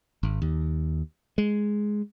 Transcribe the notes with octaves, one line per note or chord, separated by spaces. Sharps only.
G#1
D#2
G#3